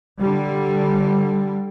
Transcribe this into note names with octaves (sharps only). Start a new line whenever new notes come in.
D3 G3